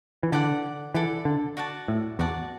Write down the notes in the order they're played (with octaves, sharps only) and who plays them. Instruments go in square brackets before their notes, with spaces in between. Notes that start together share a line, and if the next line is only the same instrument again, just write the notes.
[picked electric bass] E3
[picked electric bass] D3 [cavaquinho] A4 D5 F#5
[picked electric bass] E3 [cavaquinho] A4 D5 F#5
[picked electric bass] D3
[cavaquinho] F#4 D5 F#5 A5
[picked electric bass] A2
[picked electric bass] E2 [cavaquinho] F#4 D5 F#5 A5